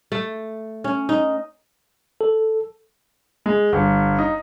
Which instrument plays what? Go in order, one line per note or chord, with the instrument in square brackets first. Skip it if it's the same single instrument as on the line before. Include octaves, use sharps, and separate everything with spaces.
[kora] A3
C#4
D#4
[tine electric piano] A4
[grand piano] G#3
G1
D#4